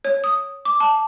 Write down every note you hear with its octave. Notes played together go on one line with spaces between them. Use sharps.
C#5
D#6
D6
A5